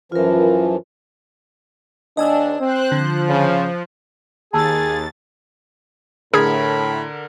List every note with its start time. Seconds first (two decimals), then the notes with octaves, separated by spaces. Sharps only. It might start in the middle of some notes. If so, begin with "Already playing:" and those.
0.12 F#2 E3 F3 F4 A#4
2.17 D#2 D4 D#5 G#5 E6
2.60 C4 C5 F#6
2.92 D3 F3
3.29 C#3
4.53 D#2 G#4 A5 A#5 E6 A6
6.34 A2 D3 G#4 A#4 B5 G#6